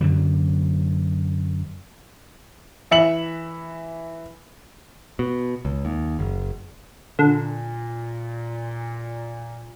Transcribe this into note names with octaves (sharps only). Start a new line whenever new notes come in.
F#2 D3 F#3
E3 E5 C#7 F#7
B2
C#2
D#2
F#1
A#2 D3